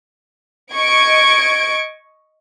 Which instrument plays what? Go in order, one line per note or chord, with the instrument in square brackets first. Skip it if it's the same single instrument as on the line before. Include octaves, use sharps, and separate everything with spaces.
[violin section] D#5 C#6 G#6 D7